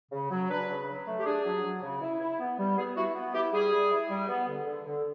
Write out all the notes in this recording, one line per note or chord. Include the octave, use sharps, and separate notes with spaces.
C#3
F#3
D4 B4
C#3
F#3
A3
G4
D4 G#4
F#3
F#3
C#3
E4
E4
B3
G3
B3 G#4
E4 F#4
B3
E4 G4
G3 G#4
G3
E4
G3
B3
D3
D3
D3